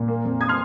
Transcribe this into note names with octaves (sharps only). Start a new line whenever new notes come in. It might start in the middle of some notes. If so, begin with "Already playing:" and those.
Already playing: A#2
A#3
F2
D#6 G#6
C6 F6